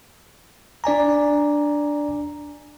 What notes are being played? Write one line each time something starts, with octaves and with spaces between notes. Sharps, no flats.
D4 D5 G#5 A#5